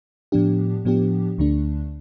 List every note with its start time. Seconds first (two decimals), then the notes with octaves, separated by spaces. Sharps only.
0.32 A2 F3 B3 D4 G4
0.85 A2 F3 B3 D4 G4
1.38 D2 D3 A3 D4